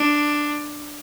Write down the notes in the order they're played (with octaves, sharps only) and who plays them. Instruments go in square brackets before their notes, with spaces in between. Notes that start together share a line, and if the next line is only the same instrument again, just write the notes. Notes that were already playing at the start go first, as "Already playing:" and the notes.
Already playing: [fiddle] D4